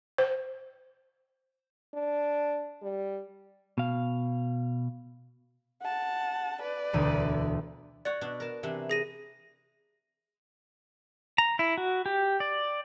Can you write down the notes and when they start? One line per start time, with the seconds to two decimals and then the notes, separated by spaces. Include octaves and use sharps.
0.18 C5
1.94 D4
2.82 G3
3.78 B2 F5
5.82 F#5 A5
6.61 B4 D5
6.93 E1 D2 D#7
8.05 F#4 C#5 D5 F#5
8.21 B2 D4
8.40 A#4 A5
8.63 C3 E3 D4
8.90 G#4 A#6 D#7
11.38 A#5
11.59 E4
11.78 F#4
12.06 G4
12.40 D5